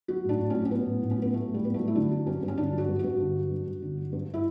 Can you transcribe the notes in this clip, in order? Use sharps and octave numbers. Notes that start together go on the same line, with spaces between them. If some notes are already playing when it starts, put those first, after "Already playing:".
F#3 F#4
A2 D4
A2
F#3 C#4
C#4
F#3 B3
A2
A2
C#4
F#3 B3
F#3 A3
A2
G3
A2 B3
A3
F#3
E4
D3 D4
F#3
G2 C#4
G2
C#4
D3 D4
F#3
F#4
G2
G2 F#4
D3
F#3
G2
G2
D3
F#3
G2
E4